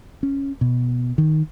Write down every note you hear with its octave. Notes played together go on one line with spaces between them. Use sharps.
C#4
B2
D#3